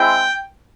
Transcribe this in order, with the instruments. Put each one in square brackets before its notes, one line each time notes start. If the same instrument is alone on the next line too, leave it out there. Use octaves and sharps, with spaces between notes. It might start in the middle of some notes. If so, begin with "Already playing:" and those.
Already playing: [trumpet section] G#3 C4 E4 G5